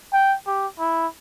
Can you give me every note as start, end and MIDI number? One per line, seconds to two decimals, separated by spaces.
0.13 0.36 79
0.47 0.67 67
0.79 1.07 64